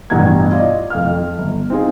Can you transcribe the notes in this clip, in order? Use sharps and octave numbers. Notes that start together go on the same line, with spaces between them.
A1 G2 B2 F#5 A#5 G#6
F4 D5 D#5
F2 F5 F6
F2
G1
C4 D#4 F4 G#4